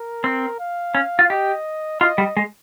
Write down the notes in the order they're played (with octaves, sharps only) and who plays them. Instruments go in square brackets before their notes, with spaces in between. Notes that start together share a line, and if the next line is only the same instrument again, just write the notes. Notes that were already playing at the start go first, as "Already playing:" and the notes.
Already playing: [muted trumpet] A#4
[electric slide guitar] C4
[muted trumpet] F5
[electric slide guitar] C#4
F4
[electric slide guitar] G4 [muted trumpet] D#5
[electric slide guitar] F4 [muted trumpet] D#5
[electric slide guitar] G3
G#3